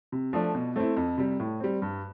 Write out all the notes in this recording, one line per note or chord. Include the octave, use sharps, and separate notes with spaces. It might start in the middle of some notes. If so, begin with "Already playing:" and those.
C3
F3 A3 D4
B2
A3 C4 E4
F2
C3 G3
A2
G3 C4
G2